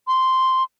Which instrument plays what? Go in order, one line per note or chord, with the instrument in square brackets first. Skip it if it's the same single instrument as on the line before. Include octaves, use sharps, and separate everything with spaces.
[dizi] C6